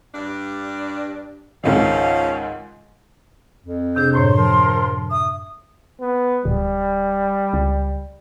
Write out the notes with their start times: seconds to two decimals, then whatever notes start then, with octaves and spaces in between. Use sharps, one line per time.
0.15 G2 D4
1.64 C#2 G#2 D#3 F3 C#4 F5
3.65 F2
3.96 C3 D4 G#4 G6
4.13 F#2 A2 C5 C#5 C6
4.36 F3 A#4
5.11 E5 D#6
6.01 B3
6.45 D1 G3
7.53 C#2